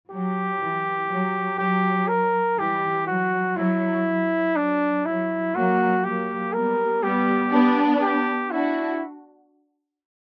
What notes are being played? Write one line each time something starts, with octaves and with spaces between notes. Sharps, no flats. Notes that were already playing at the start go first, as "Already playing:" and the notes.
F#3 G4
E3
F#3
F#3 G4
A#4
E3 G3 G4
F#3 F#4
F#3 E4
F#3
F#3 D4
F#3 E4
F#3 A#3 F#4
F#3 A#3 G4
G3 B3 A#4
G3 B3 G4
B3 D4
G4
D4 E4 F#4